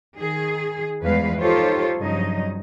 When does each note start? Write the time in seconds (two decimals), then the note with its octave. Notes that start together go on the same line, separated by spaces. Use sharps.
0.17 D#3 G#4
1.01 E2 G2 F3 G#3 B4 F5
1.40 D#4 F4 G4 A4 C5 C#5
1.97 G2 C#3 F3 F#3 D#4 D#5